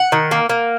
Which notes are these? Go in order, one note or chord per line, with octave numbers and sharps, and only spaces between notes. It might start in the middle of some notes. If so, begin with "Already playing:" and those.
Already playing: F#5
D#3
A#3
A#3